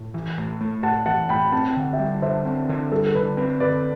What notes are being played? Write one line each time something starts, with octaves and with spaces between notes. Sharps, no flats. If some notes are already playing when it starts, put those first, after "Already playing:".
Already playing: A2
E3
A2
A3
A2 F#5 A5
E3 F#5 A5
A2 G5 B5
C4 A5
G5
D3 F#5
E5 G5
G3
D3 C5 E5
C4
D3
G3 A4
A4
D3 B4
C4 B4
D3 B4 D5